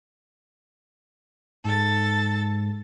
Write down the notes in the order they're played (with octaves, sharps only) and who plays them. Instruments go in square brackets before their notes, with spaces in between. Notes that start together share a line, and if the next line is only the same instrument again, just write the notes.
[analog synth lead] G#2 [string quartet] A4 A6